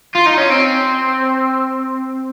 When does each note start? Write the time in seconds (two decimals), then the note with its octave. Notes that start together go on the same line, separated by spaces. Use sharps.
0.15 F4
0.26 D#4
0.38 C#4
0.50 C4